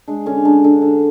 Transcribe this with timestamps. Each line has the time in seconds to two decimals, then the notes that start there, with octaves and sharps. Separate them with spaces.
0.08 G#3 D4
0.26 D3 C#4
0.45 G#3 D4
0.64 D3
0.82 D3